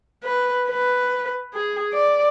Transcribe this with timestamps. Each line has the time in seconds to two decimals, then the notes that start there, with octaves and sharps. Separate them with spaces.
0.23 B4
0.68 B4
1.54 G#4
1.93 D5